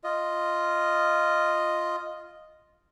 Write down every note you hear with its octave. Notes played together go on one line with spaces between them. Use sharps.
F4 D#5